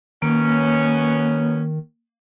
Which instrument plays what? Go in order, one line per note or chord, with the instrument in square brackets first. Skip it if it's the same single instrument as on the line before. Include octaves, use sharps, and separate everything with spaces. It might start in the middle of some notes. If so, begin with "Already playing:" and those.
[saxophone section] B2 B3 C#4 [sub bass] D#3 [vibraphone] A#3